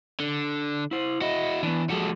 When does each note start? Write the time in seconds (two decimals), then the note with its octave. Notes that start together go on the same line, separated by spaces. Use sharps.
0.20 D3
0.91 E4 C5
1.21 E4 F#4 D#5
1.63 E3 B3 D4
1.90 F3 G3 G#3 F#4 A4